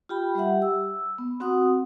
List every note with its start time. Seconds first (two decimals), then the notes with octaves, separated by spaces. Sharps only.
0.09 F4 G4 G5 B5
0.35 G3 G4 E5 F#5
0.62 E6
1.18 B3
1.40 C4 F#4 F#5 D#6